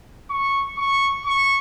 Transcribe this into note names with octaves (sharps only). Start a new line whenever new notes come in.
C#6
C#6
C#6